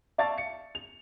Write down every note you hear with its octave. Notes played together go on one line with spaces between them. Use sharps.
D5 E5 F5 A5 C#6 A6
C#7
F7